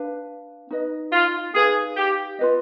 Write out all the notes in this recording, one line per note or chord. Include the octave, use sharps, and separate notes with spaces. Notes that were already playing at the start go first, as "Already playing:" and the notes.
Already playing: D4 B4 F5
D#4 B4 D#5
F4
D#4 G#4 B4 F5 G#5
G4
F4 B4 D#5